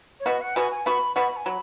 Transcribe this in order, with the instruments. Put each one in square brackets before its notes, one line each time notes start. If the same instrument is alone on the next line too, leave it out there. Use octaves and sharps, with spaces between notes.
[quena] C#5
[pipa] B2 B3 F#4 [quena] D#5
[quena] F#5
[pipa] B2 B3 F#4 [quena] G#5
[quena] G#5
[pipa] B2 B3 F#4 [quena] B5
[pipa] B2 B3 F#4 [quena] B5
[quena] G#5
[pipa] F#3 [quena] B5